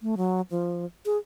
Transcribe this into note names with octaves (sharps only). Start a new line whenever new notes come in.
A3
F#3
F3
G#4